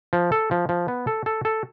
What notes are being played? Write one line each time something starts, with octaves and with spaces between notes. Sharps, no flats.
F3
A4
F3
F3
B3
A4
A4
A4